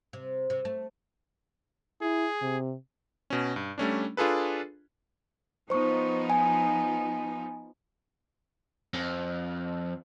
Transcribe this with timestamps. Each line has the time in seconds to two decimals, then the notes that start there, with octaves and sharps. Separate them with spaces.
0.13 C3
0.50 C3
0.65 A3
2.01 E4 G#4
2.42 C3
3.30 B2 C#4
3.56 G2
3.78 G3 A3 C#4 D4
4.17 D4 F4 G#4 A4 B4
5.70 F3 B3 D#4 C5 C#6
6.30 G#5
8.94 F2